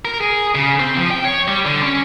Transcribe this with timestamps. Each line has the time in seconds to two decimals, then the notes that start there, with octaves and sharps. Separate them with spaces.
0.05 A#4
0.21 G#4
0.55 C#3
0.80 C4
0.97 F3
1.11 G5
1.25 C#5
1.48 G3
1.66 D3
1.83 C#4